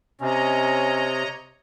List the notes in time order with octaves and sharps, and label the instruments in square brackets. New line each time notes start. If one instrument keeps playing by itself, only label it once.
[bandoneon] C3 [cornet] C#4 [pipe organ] C#5 D#5 A#5